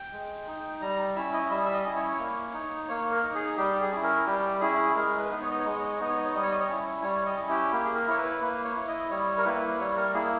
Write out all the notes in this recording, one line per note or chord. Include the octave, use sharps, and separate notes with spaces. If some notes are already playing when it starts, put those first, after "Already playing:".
Already playing: G5
G#3
D#4
G3 A#5
C#4 E4 E5
D#5
G3 E5
E5
D#5
C#4 E4
C#5
A#3
D#4
A#3 C#5
A#4
D#4
G#4
G3 G4
G#4
C#4 E4
A#4
G3 G4
C#4 E4 G#4
G#3 A#4
B4
B3 D#4
C#5
D#5
C#5
G#3 D#5
C#5
D#5
C#5
B3 D#4 D#5
C#5
D#5
C#5
G3 D#5
C#5
D#5
C#5
C#4 E4
G3 C#5
D#5
C#4 E4
G4
A#3 G4
G#4
A#4
E4 C#5
B4
A#3 B4
C#5
E4
D#5
G3 C#5
A#4
A#3 E4 B4
G3 C#5
A#4
A#3 E4 G#4